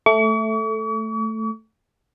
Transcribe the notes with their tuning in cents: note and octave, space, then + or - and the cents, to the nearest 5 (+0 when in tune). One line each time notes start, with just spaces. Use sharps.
A3 +0 C#6 +45